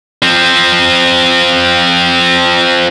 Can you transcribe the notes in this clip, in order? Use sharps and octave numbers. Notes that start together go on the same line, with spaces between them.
F3 C4